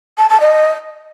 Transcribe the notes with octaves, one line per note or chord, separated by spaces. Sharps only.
A5
A5
D#5